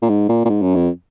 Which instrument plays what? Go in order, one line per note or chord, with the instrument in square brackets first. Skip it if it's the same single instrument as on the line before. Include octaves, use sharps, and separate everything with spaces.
[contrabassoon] A#2
G#2
A#2
A#2
G#2
F#2
F2